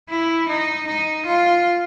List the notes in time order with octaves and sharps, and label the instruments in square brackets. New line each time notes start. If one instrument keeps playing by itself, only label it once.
[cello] E4
D#4
D#4
F4